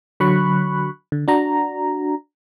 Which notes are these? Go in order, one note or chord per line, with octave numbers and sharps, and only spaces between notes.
D3 F#3 B5 C#6 F#6
D3
D4 F#4 A#5